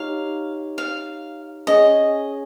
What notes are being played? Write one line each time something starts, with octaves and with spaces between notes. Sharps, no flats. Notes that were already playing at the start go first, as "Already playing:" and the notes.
Already playing: D#4 G4 C#5 F5
F5
C#4 G#4 C#5 D#5 G#5